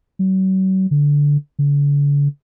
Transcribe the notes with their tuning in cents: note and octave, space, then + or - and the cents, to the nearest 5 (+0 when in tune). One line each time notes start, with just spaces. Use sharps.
F#3 +40
D3 -15
D3 -45